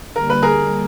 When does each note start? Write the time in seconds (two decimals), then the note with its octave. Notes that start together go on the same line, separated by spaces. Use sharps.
0.16 D3 G3 A#3 A#4
0.30 B4
0.43 G#4 A#4